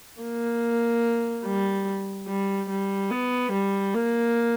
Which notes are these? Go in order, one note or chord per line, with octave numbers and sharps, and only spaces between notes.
A#3
G3
G3
G3
B3
G3
A#3